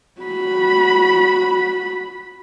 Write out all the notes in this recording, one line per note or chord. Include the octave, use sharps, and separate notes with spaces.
F#4 B5